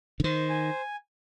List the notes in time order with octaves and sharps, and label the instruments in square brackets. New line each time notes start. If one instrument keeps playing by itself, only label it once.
[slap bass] D3
[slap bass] D#3 [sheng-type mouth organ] C5
[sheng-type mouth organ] G#5